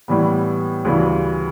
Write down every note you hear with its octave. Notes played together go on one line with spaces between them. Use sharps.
A2 E3 G3 B3
D2 C#3 E3 G3